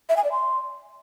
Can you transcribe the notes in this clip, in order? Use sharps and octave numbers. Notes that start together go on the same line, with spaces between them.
E5
G#5
D5
C6